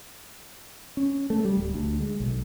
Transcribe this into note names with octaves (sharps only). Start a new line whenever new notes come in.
C#4
A3
G3
D1
D2
G#3
B1